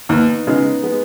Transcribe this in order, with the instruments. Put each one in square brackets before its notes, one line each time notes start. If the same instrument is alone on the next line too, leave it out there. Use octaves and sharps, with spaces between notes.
[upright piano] D#2 [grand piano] B3 D#4
[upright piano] C#3 G#3 [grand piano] B3 D#4
[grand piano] G#3 B3